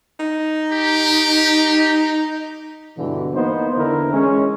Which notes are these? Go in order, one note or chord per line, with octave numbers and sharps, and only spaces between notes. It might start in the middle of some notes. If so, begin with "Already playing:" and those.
D#4
G4
G2 B2 D3 E3
A#3 B3 D#4 C5
E2 D3 E3 E4 A#4
G#3 C#4